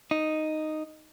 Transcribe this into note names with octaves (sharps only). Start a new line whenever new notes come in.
D#4